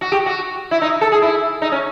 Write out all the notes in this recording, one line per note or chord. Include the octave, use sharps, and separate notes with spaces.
F#4
G4
F#4
E4
D#4
A4
G#4
E4
D#4
C#4